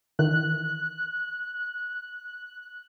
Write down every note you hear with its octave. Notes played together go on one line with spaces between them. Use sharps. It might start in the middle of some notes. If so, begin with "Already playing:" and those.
D#3 E3 F#6